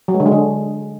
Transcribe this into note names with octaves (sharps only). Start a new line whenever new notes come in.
F#3
G#3
D3
G#3
D3